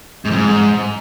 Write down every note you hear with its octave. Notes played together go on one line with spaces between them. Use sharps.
G#2
F2
G#2